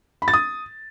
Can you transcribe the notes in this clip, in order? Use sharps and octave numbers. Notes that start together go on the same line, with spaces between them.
B5
A6
D#6